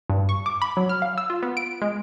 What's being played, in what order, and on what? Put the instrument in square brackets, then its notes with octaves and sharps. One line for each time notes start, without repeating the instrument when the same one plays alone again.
[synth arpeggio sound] G2
C#6
D6
B5
F#3
F6
F5
E6
F4
B3
D7
G#3